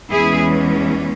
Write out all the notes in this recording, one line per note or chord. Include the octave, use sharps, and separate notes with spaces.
E2 E3 G#3 C#4 E4 G#4